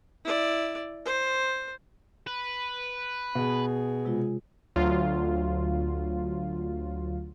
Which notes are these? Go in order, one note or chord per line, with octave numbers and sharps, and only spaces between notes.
E4 D5
C5
B4
B2 G#4
C3 G#3 F4
D2 F#3 F4